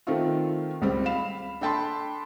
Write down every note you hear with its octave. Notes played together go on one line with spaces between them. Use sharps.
D#3 A3 C4 F4
C#2 G3 C4
F5 B5 E7
D4 A4 G5 A5 B5 C6